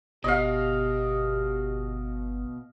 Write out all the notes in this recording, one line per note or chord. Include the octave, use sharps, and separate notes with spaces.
G1 B2 G4 D#5 F5